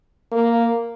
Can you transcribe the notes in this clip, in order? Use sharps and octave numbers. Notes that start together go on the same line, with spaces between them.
A#3